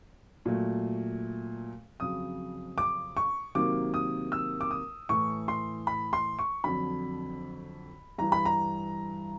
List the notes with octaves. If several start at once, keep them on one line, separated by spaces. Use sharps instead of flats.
A#2 F#3 A3
F2 C#3 F#3 D#6
D6
C#6
C3 D#3 F#3 A#3 D6
D#6
E6
D6
D#6
A2 E3 A3 C#6
C6
B5
C6
C#6
F2 D3 F#3 B5
G2 E3 G3 A#5
B5
A#5